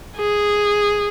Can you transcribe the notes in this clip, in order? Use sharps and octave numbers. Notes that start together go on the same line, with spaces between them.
G#4